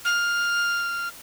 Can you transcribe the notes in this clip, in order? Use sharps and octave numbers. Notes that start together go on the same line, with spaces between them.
F6